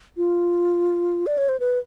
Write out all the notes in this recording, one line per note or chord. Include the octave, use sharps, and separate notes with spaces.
F4
D5
C#5
C5
B4